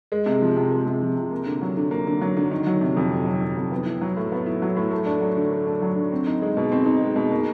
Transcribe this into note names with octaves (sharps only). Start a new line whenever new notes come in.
G#3
C3
F3
C3
G#3
C3
F3
C3
A#3
D3
F#3
D3
A#3
D3
F#3
D3
D#3
F#3
C3
F2
D#3
F#3
C3
F2
B3
E4
F#3
A2
B3
E4
F#3
A2
A3
D4
F#3
D3
A3
D4
F#3
D3
C4
D#4
G#3
B2
C4
D#4
G#3
B2
A#3